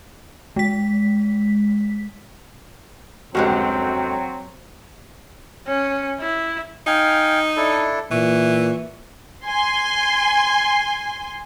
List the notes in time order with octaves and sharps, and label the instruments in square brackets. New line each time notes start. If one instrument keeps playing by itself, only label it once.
[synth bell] G#3 B6
[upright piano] F1 C#2 [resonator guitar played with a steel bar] D3 G#3 F#4 [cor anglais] F#3 [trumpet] C4
[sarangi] C#4
E4
[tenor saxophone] D#4 [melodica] F5 G5 G#5
[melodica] D4 E4 A4
[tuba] A#2 [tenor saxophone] E3 [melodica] C#6
[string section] G#5 C6